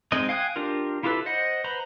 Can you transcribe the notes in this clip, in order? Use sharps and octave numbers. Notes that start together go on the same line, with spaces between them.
G#3 C4 D#4 D#5
F5 G5 G#5 D#6 F#6
D4 F4 G4 A#4
E4 F4 G4 A4 B4
C5 D#5 F#5
B4 C5 A#5 B5